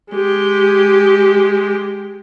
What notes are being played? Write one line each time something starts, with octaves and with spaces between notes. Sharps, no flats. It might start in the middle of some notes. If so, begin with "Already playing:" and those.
G#3 G4